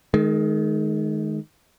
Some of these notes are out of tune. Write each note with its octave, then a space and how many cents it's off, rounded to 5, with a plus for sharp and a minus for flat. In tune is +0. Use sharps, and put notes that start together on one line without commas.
D#3 +0 G#3 +35